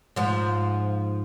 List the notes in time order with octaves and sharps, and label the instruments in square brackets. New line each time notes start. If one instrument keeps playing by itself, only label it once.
[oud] G#2 F3